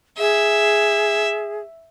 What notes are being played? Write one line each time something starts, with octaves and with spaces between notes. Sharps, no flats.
G#4 E5